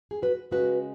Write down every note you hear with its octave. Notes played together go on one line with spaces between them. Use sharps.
G#4
F#4 B4
C#3 G#3 F#4 B4